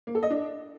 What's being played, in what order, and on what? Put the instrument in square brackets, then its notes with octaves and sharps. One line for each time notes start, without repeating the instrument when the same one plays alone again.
[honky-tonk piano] A#3
A4
D#5
D4